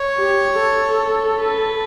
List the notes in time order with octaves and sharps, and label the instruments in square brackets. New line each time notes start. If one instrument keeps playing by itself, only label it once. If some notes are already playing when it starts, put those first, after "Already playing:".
Already playing: [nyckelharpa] C#5
[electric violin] G4
A4
[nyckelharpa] B4